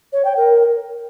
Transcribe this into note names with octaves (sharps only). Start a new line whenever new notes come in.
C#5
G5
A#4